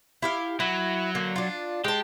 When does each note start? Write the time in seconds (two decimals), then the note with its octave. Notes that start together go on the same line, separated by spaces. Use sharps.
0.22 E4 G4 F5
0.60 F#3 E4
1.15 D3 A#3
1.36 D4 F4
1.84 G#3 G4 A5